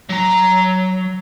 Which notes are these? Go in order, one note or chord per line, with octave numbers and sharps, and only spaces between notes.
F#3 A#5